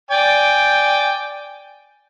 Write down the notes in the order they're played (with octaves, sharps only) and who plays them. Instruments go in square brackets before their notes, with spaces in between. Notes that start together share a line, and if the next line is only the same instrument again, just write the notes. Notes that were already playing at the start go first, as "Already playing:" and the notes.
[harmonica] D5 G5 G#5